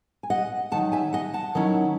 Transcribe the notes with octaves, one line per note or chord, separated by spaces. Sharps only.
G#5
D#5 F#5
G#2 D#3 F#3 F#5 A5
E5 G#5
D#5 F#5
F#5 A5
D#3 F#3 C#4 E4